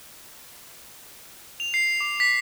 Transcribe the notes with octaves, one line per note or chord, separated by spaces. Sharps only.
F7
C7
D6
B6